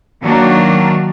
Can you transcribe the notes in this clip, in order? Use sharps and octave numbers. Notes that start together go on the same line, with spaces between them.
D#3 F#3 A#3 D4 F#4